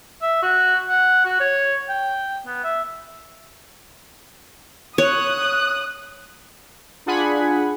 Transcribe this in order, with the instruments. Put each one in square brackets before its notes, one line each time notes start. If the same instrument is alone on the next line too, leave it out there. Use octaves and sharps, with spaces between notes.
[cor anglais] E5
F#4
F#5
F#4
C#5
G5
B3
E5
[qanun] C#5 [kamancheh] D#6 F#6
[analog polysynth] D4 F4 G#4 F#5 G#5 B5